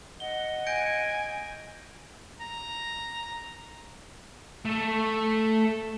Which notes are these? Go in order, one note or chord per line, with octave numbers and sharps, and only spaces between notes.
D#5 F#5 G7
G#5 G6 A#6 D7
A#5
A3 A4